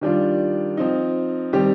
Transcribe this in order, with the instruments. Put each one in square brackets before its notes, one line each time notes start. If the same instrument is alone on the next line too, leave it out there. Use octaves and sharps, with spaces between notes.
[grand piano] D#3 G3 D4 F4
F3 C4 D#4
D#3 G3 C4 G4